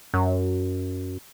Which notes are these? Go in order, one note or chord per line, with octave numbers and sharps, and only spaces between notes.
F#2